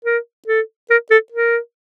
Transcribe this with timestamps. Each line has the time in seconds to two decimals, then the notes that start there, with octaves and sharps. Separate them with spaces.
0.05 A#4
0.47 A4
0.90 A#4
1.11 A4
1.32 A#4